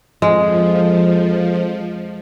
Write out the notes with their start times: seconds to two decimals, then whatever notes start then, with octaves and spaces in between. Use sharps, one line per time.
0.22 F2 F3 G#3